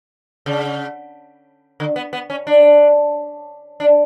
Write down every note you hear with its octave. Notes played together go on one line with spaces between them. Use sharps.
C#3
D3
B3
B3
C#4
D4
D4